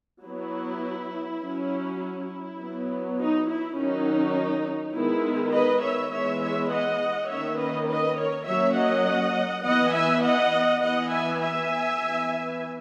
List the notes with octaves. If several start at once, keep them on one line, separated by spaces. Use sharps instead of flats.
F#3 B3 E4
F#3 C#4
E4
F#3 B3
D#4
E4
D#3 F#3 C#4 D#4
D#3 G#3 B3 E4
B4 D#5
C#5 E5
E3 G#3 B3 C#5 E5
C#5 E5
D#5 F#5
D#3 A#3 C#4 C#5 E5
B4 D#5
B4 D#5
A#4 C#5
F#3 A#3 C#4 C#5 E5
D#5 F#5
E3 B3 D#5 F#5
E5 G#5
D#5 F#5
E3 B3 D#5 F#5
E5 G#5
E5 G#5
E3 B3